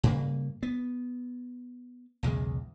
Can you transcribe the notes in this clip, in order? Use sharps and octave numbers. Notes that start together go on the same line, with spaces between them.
G2 C#3 A#3
B3
B1 E2 C#3 G#3